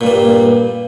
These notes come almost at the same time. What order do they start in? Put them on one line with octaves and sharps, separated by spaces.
A#2 G2 G3